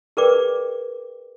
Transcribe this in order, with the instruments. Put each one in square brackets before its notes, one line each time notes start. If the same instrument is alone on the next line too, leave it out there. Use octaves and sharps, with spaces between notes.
[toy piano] G#4 A#4 B4 D5 G5 D6